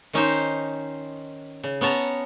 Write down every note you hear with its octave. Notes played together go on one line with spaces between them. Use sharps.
D#3 C#4 D#4 C5
C#3
B3 C#4 C#5 A5 A#5